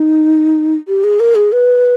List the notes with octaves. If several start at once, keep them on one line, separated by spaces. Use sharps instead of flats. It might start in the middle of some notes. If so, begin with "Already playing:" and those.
Already playing: D#4
G4
G#4
A#4
G#4
B4